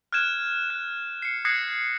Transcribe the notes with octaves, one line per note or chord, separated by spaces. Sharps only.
F6 F#6 G#6 E7
F#6
C7 C#7
D#6 F#6 G#6 A#6 C7 C#7